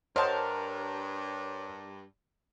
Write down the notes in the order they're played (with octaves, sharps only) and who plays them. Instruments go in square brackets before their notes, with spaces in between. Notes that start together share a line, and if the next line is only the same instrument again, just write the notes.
[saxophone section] G2 [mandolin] A#4 A5 [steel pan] C5 D#5 F#5 [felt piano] C#5